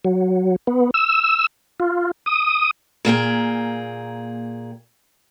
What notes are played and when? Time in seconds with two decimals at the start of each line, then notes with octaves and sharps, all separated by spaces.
0.05 F#3
0.67 B3
0.94 E6
1.80 F4
2.26 D#6
3.05 A#2 A#3 G#4 G5